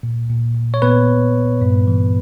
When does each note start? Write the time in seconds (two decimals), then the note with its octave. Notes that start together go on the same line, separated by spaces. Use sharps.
0.03 A#2
0.30 A#2
0.55 A#2
0.74 C#5
0.82 A#2 B3 B4
1.09 A#2
1.35 A#2
1.61 G2
1.87 E3